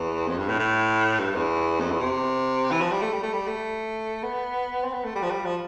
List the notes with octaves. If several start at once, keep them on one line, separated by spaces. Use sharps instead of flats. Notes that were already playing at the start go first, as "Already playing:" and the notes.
Already playing: E2
F2
G2
A2
A2
G2
E2
F2
E2
C3
E3
F3
G3
A3
G3
A3
G3
A3
B3
C4
B3
A3
G3
F3
G3
F3